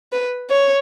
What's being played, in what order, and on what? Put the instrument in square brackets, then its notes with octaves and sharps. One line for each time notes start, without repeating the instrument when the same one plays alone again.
[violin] B4
C#5